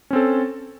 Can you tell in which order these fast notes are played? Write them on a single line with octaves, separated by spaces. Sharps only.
C#4 C4 A4